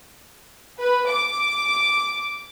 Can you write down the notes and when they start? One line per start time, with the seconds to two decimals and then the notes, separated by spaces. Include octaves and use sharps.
0.80 B4
1.09 D6